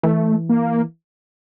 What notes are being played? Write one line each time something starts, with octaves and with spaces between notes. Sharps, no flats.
E3 A3
A#3